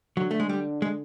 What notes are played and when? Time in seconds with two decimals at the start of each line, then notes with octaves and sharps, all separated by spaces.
0.17 D3 F#3
0.31 A3
0.40 G#3
0.49 G3
0.82 G#3